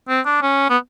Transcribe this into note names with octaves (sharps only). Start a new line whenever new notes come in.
C4
D4
C#4
B3